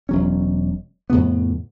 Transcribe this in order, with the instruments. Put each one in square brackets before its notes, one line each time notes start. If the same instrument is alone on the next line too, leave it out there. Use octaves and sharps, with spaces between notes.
[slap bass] E1 F#3 C#4
F2 A2 C#3 B3